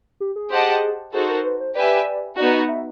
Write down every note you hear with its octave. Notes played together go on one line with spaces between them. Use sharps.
G4
G#4
G4 C5 D#5 F#5 A5
D#4 F#4 G#4 A4 C5
A#4
B4
C5
G4 B4 D5 E5 G#5
B3 D#4 F#4 D5
D#5
E5